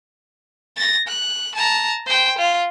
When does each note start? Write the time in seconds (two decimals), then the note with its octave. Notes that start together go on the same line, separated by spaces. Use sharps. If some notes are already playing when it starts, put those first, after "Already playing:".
0.76 A6 A#6
1.07 F#6
1.55 A5 A#5
2.06 C5 G5
2.38 F4